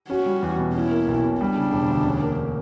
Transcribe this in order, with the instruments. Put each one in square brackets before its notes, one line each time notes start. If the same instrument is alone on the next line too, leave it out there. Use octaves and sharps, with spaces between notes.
[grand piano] C#4 [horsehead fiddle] F#4
[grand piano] G3
E2
B2
[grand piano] C#4 [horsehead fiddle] E4
[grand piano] A#3
B1
B2
[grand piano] G3 [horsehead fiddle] D4
[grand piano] C#3
E1
D2
C#4
A#3